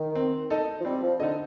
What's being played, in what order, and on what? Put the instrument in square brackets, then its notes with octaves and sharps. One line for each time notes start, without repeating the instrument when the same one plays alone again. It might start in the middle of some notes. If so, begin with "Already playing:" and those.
Already playing: [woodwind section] D#3
[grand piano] C4
D#4 A4 D#5
[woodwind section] F3
[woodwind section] G3 [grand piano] C4
[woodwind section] F3
[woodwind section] D3 [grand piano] D#4 A4 D#5